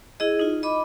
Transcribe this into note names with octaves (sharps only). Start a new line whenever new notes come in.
E4 G#4 D#5
D#4 F4
D#5 B5 D6